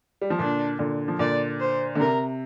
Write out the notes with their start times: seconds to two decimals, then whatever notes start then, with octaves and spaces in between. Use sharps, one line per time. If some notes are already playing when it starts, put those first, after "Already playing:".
0.21 G3
0.30 F3
0.38 A#2 D3 D4
0.79 A#2 D3
1.08 F3
1.19 A#2 D3 D5
1.60 C5
1.95 D3
2.00 C3 A#4